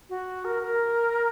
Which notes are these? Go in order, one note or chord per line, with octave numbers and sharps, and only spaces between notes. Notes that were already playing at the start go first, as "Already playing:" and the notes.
F#4
A#4
A#4